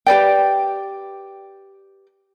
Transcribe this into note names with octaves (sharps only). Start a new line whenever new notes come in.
G4 B4 D5 G5